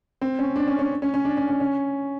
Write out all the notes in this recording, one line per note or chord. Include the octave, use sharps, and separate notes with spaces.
C4
C#4
D4
C#4
C#4
C#4
C#4
D4
C#4
C#4
C#4